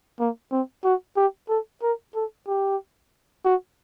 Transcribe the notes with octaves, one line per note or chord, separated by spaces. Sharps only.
A#3
C4
F#4
G4
A4
A#4
A4
G4
F#4